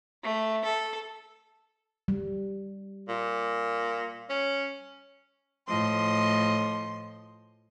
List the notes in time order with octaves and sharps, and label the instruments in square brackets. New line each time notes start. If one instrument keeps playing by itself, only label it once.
[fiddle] A3
A4
[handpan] G3
[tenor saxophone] A#2
C#4
[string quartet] A2 F3 D#5 C6